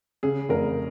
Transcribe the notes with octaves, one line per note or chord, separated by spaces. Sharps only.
C#3 G#4
F1 A#4